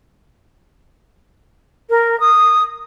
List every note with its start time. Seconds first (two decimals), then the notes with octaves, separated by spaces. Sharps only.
1.90 A#4
2.20 D#6